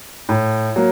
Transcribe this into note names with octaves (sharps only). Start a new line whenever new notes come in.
A2
F#3 A#3